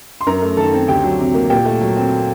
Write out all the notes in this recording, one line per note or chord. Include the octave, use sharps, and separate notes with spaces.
C6
F#2 A#4 A#5
A3
D#3 A4 A5
C4
D2 G4 G5
F#3
C3
A#3
A#2 G4 G5
A3
F#3
C4